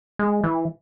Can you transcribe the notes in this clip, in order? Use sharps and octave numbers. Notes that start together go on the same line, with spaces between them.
G#3
E3